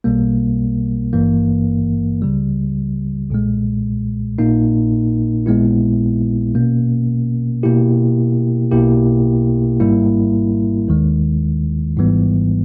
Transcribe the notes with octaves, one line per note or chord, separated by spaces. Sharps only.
B1 B2 G3 A#3
G#1 G2 E3 A#3
C#2 C#3 G3
B1 A#2 G#3
A#1 A#2 A#3 D#4
A#1 A#2 G#3 B3 E4
B2 A#3 C#4
B2 A#3 E4 G4
B1 B2 A#3 E4 G4
G#1 G#2 G3 A#3 E4
D#2 D#3 G#3
G#1 G#2 E3 G3 B3